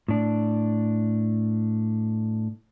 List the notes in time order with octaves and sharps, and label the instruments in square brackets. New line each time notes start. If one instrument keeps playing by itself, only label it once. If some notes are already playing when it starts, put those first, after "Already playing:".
[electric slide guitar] A2 D4